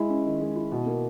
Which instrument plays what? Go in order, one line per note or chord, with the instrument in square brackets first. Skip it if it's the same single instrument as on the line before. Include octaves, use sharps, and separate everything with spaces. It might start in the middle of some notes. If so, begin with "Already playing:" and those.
Already playing: [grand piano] G#3 E4
C#4
D#3
G#3
E4
B2
A#3